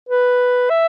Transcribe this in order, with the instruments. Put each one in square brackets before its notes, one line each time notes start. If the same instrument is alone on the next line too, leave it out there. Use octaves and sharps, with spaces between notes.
[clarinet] B4
E5